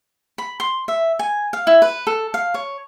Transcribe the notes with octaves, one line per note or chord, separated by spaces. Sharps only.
B5
C6
E5
G#5
F5
E4
B4
A4
F5
C#5